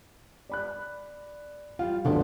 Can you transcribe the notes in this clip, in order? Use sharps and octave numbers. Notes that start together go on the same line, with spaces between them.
D5 B5 F#6
G3 F4 F5
G1 D2 D3 E3 D4 A4